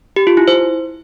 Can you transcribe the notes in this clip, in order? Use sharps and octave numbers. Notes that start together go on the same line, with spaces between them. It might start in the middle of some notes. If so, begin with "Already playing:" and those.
G4
F4
E4
C5